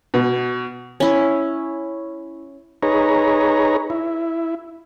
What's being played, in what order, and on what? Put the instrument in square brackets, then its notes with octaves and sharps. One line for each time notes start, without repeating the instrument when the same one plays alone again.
[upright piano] B2
[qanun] C#4 E4
[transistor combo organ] D#4 G#4 B4 C#5 A#5
E4